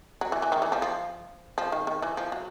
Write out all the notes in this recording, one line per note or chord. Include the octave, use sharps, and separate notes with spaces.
F#3
E3
E3
D#3
E3
F3
F3
F3
D#3
D#3
E3
F3
F#3